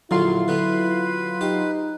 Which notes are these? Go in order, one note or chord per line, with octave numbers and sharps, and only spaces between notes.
A#1 D3 F#3 E4 F4 C6
D3 B3 B4
D#4 G4